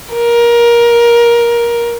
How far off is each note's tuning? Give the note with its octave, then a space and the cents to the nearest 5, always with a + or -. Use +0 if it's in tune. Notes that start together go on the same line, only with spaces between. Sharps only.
A#4 +20